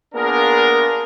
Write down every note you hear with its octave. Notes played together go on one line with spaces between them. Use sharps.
A#3 B3 D4 F4 G#4 A#4